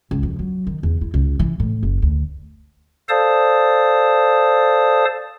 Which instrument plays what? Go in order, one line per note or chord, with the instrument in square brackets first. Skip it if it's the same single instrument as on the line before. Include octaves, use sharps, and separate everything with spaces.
[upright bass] C#2
F2
F#3
D#3
E2
E4
C#2
E3
A2
F#1
D2
[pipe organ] A4 C5 D5 F5 A5 D#6